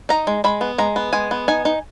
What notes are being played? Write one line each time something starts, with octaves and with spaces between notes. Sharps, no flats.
D#4 A#5
G#3
G#3 B5
B3
G#3 A#5
B3
G#3 G#5
B3
D#4 G#5
D#4